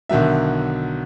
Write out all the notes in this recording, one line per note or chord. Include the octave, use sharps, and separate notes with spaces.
B1 D3 D#3 F#3 E5